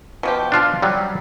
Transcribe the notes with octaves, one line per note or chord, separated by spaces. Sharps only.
B2 F3 G4
D4 F4
F#3 G3